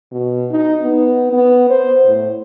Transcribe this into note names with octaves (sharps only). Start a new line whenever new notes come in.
B2
D#4
B3
B3
C5
A2